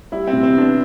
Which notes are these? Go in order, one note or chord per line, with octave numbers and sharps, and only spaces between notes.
G3 E4
C4
C3
C4
B3
D4